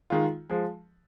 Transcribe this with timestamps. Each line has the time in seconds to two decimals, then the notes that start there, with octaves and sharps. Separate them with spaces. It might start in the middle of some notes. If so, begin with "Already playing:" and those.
0.10 D#3 G#3 F4
0.50 F3 G#3